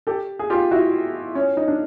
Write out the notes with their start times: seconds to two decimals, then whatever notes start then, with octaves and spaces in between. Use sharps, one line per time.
0.07 G4 A4
0.39 G#4
0.50 F4 G4
0.71 E4 F#4
1.35 C#4
1.57 D#4
1.68 D4